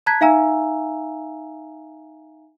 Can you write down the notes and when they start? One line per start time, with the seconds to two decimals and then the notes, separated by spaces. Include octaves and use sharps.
0.06 A5 A#5 F#6 G#6 B6
0.21 D#4 E5 F5 G#5 A#5 E6